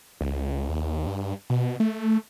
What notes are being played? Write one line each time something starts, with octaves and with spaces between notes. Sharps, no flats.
C#2
D#2
G2
B2
A3